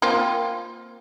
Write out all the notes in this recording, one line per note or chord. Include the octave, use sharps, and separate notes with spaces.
A#3 C4 F4